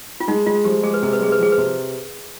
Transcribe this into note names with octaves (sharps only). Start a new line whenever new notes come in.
F4
G#3 D#4
G#3 F4
F3 G4
G#3 G#4
B4
C3 G#4
B4
G#3 G#4
B4
F3 G#4
B4
C3